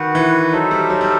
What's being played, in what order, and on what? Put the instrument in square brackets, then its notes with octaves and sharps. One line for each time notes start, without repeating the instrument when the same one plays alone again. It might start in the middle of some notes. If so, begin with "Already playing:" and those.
Already playing: [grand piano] D#3 [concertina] F#4 B4 F#5
[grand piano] E3
[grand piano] F#3 [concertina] D#4 A4 C5 E5
[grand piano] G3
F#3
G3